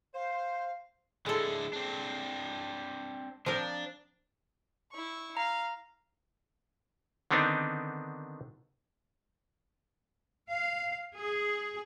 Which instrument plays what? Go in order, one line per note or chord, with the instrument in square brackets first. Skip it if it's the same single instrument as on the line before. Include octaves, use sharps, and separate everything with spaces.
[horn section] C5 [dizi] F5
[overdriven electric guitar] D3 E4 [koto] G#3 A4
[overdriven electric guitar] C4 D4
[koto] F3 C4 A#4 [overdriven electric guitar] D4
[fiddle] E4 C#6
[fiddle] F5 [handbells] A#5
[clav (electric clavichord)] D3 D#3 B3 C4 D4 D#4
[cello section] F5
G#4